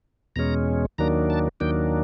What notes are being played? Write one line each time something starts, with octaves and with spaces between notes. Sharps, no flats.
E2 B2 G#3 C#4 A#5
D#2 D#3 F#3 A#3 D4 A#5
A5
D#2 D#3 F#3 A#3 D4 G5